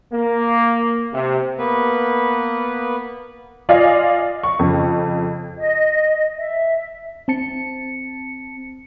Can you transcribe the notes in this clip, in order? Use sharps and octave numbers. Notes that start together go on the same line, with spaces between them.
A#3
C3
A#3 B3 B4
F4 D5 D#5 F5 G#5
C#6
F2 C#3
D#5
E5
C4 A5 C#7